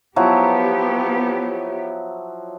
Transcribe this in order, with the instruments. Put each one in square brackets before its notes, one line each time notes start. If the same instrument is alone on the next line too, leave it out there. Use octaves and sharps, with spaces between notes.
[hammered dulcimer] F3 F#3 E4 [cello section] B3 G4